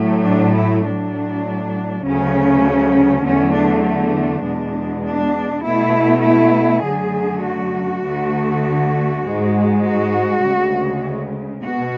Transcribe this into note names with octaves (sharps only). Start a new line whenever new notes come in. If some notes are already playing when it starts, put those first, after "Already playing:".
Already playing: A2 F#3 A3
D4
E4
A2 F#3 A3 D4
D2 C#3 F#3 A3 C#4
E2 D3 F#3 A3 C#4
D4
D4
E2 B2 G#3
D4
B2 A3 E4
E4
F#2 D3 F#3 A3 G#4
F#4
D2 D3 A3
G#2 G#3
F#4
D2 C#3 G#3
B2 F#4